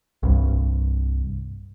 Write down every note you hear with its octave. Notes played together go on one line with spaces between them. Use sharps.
C2 G2